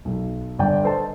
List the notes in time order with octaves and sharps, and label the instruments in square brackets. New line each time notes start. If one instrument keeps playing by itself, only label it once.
[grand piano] B1
G1 D5 G5
A4 B4 C5 D#5 A5